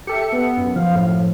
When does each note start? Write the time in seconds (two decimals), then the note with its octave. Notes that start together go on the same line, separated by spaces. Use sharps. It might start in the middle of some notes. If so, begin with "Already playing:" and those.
0.07 G4 A4 E5 C#7
0.32 B3
0.57 F#2
0.76 F3 F5
0.96 A2